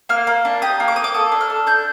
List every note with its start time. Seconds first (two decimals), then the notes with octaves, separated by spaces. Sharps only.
0.09 A#3 F6
0.27 A#3
0.45 D4
0.62 G4 D#6
0.80 A#3
0.88 D6
0.96 A#3 D#6
1.04 D6
1.14 A4 D#6
1.32 D4
1.41 F6
1.50 A4
1.67 D4 G6